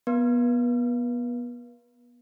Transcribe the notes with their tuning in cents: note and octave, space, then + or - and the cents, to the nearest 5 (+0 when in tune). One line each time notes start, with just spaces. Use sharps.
B3 -25 B4 -40